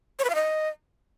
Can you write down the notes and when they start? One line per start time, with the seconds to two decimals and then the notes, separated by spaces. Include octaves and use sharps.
0.19 C#5
0.25 B4
0.30 F5
0.35 D#5